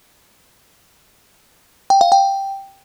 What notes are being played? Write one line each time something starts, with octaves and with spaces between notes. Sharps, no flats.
G5
F5
G5